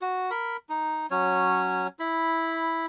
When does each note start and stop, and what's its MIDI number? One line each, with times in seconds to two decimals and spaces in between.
0.02 0.30 66
0.31 0.57 70
0.31 0.57 83
0.69 1.06 63
1.11 1.87 54
1.11 1.87 61
1.11 1.87 73
1.99 2.86 64
1.99 2.86 83